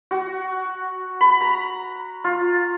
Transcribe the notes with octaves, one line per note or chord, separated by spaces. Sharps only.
F#4
B5
A#5
F4